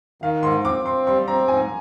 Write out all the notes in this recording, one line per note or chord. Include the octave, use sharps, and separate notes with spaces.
D#3 F5
G#2 C6
C4 D6
C4 C6
G3 C6
C4 A#5
G#2 G#5